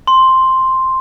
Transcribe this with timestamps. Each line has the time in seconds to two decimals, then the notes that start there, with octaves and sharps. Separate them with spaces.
0.07 C6